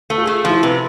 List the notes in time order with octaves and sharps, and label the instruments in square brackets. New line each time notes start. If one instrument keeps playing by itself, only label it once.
[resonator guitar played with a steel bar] A3 [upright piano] A4
[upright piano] F4
[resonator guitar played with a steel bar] A3 [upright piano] G#4
[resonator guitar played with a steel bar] F3 [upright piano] F4
[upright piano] E4
[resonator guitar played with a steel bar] C3 [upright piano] B4